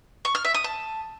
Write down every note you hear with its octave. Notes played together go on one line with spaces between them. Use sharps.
C#6
F6
E5
D#6
A5